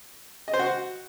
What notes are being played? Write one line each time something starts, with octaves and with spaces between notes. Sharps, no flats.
D#5
C5
F#4